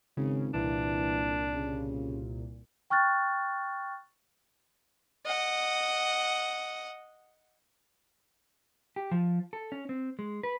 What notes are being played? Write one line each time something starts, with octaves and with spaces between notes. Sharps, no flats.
G#1 C#3
C2 A#2 E3 D4
C#3
G5 C#6 F6 F#6 A6
D#5 F#5
G4
F3
A4
C#4
C4
G#3
B4